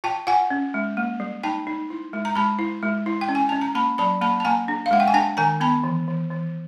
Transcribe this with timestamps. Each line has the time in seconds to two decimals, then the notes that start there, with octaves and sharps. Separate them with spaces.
0.04 F4 G5 A5
0.27 F4 F#5 G#5
0.50 C#4
0.74 G#3
0.97 A#3
1.20 G3
1.43 D#4 G5 A5
1.67 D#4
1.90 E4
2.13 G#3
2.25 A#5
2.35 G#3 A5 B5
2.59 E4
2.83 G#3
3.06 E4
3.21 G5
3.29 C#4
3.35 G#5
3.49 C#4 A5
3.61 A#5
3.75 A#3 A5 B5
3.98 F#3 A5 B5
4.21 A#3 A5 B5
4.40 A5
4.45 A#3 G#5 A#5
4.68 D4
4.86 F5
4.91 G#3 F#5
5.00 G5
5.08 G#5
5.14 D4 G5 A5
5.37 D#3 G#5 A#5
5.60 B3 A5 B5
5.84 E3
6.08 E3
6.30 E3